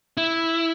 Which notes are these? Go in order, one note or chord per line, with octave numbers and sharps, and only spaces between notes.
E4